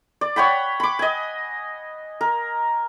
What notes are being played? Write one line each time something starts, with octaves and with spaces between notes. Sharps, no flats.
D5
C#5 F#5 G5 B5
B5 D6
D#5 G#5
A#4